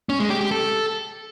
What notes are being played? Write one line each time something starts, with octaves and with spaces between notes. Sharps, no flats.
C#4
G#3
G4
G4
A4